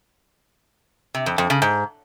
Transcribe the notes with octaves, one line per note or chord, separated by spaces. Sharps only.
C3
F2
F2
C#3
G#2